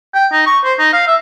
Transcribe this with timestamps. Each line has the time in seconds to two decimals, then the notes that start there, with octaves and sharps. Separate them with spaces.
0.14 G5
0.32 D#4
0.46 C#6
0.64 C5
0.79 D#4
0.93 F5
1.07 E5